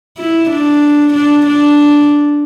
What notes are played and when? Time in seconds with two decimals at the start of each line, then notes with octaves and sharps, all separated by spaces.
0.18 E4
0.50 D4
1.14 D4
1.46 D4